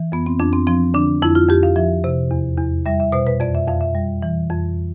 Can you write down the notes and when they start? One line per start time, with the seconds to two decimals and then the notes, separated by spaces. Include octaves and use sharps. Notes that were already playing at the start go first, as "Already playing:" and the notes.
Already playing: E3
0.12 F2 B3
0.26 C4
0.39 F2 D4
0.53 C4
0.67 F3 C4
0.94 D3 D4
1.22 F2 E4
1.35 F4
1.49 F2 G4
1.63 F5
1.76 F3 E5
2.04 C3
2.31 E2
2.58 E2
2.86 G3 E5
3.00 E5
3.12 B2 C5
3.27 B4
3.40 F2 D5
3.55 E5
3.67 F2 F5
3.81 E5
3.95 G3
4.23 E3
4.50 F2